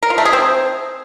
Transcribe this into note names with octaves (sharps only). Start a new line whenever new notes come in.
A#4
F4
A3
G#4
C4